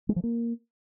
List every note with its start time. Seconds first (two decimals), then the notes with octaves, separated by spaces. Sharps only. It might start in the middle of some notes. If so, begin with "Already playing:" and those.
0.09 G#3
0.16 F3
0.24 A#3